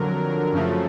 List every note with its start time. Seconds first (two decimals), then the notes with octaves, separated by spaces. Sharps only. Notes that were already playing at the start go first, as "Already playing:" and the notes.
Already playing: F2 D3 F#3 A#4
0.53 F#2 C#3 F3 A3